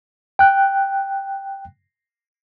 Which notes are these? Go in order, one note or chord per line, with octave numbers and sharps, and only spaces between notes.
G5 F#6